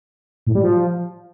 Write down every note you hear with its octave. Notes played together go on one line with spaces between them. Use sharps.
A2
G3
F3